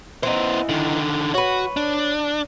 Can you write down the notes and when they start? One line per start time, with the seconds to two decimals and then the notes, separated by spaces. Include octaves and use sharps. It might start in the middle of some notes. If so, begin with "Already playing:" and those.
0.23 E3 B3 D#4 C5
0.69 D3 D#3
1.34 F#4 B4 C#5
1.77 D4